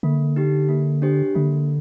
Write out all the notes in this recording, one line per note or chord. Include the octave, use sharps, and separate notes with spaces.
D3 A#3
D#4 G4
A#3
D4 G4 C5
D3 A#3